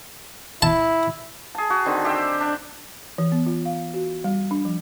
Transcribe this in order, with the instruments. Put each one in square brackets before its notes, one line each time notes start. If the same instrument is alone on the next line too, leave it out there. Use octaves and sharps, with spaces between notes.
[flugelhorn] E4 [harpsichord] A5
[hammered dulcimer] G#4 A5
F#4
D3 D#3 C4
G4 C5 E5
D4
[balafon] E3
B3
F4
F5
F#4
G3
D4
F3